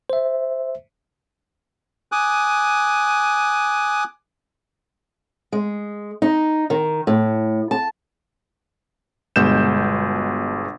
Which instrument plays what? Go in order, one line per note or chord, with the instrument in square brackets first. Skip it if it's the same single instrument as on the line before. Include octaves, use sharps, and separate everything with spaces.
[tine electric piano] C5 E5
[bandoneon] G#5 D6 D#6 F#6
[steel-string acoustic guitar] G#3
D#4
D#3
A2
A5
[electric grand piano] G1 B2 G#3 G6 E7